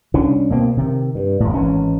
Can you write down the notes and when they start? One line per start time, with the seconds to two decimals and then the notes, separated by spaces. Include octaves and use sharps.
0.14 C2 C#4 D4
0.50 B2 A#3 C4
0.77 C3 D#3
1.15 G2
1.40 E1 A2
1.54 G#1 E3 C#4